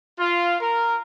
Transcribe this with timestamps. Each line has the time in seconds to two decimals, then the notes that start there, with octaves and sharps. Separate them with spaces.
0.19 F4
0.61 A#4